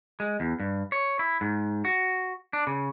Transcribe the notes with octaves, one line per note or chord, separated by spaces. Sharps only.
G#3
E2
G2
C#5
E4
G#2
F#4
D4
C#3